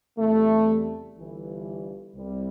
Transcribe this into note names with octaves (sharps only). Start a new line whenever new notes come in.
E2 C3 E3 G3 A3
G1 G2 E3
C2 C3 G3